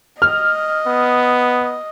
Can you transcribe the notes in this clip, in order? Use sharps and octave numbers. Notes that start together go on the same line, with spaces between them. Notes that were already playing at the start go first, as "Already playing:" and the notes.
D#5 F6
B3